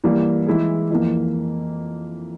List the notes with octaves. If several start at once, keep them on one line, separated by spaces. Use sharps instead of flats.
E3 G3 A#3
E3 G#3 E4 G#4
F2 E3 A#3